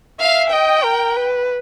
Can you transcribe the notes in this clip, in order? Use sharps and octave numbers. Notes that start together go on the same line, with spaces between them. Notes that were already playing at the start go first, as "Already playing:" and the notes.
E5 F5
D#5 G5
A#4
B4